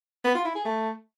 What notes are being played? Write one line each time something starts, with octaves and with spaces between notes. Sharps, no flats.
B3
F4
E4
G#4
A3